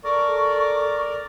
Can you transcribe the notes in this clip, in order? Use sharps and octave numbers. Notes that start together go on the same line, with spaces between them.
A4 A#4 D5 C#6